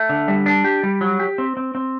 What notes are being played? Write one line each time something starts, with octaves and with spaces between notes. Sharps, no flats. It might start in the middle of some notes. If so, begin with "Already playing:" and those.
Already playing: A3
D3
G3
D4
G4
G3
F#3
G4
C4
C4
C4